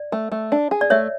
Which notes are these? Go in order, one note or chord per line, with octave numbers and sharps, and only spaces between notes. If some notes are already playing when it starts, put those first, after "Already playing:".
Already playing: D5
A3
A3
D4
G#4
D5
A3 C#5 E5